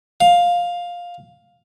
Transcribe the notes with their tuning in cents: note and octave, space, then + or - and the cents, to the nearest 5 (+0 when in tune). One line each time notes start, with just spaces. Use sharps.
F5 +10